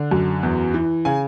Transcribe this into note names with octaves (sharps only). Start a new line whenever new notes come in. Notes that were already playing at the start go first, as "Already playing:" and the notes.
Already playing: D3
F#2
E2
E3
C#3 G#5